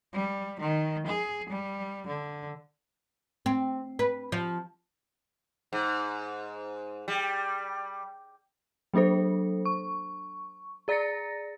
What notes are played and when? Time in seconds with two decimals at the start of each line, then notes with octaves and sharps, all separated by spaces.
0.13 G3
0.60 D#3
1.07 G#4
1.49 G3
2.07 D3
3.46 C4
3.99 B4
4.32 F3
5.73 G#2
7.08 G3
8.94 F#3 A#3 D4 A4 C5
9.65 C#6
10.88 G#4 D5 A#5 A6 A#6 C#7